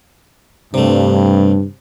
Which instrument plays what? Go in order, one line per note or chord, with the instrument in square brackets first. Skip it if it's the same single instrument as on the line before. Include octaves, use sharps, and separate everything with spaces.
[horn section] G2 [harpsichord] C3 A3